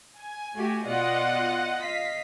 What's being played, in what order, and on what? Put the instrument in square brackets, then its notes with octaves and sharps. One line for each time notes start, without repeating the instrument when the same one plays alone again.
[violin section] G#5
[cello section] A3 F#4 G4
[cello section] B2 B3 D5 [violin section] F4 D#5 F#5
[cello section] D#5 F5 [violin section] B6